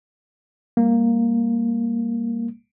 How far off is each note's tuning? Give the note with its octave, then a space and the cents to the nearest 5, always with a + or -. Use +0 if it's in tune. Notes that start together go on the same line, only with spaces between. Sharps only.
G3 +40 A#3 +0